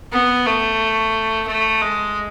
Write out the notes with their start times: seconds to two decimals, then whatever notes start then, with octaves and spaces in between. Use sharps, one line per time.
0.12 B3
0.46 A3
1.48 A3
1.81 G#3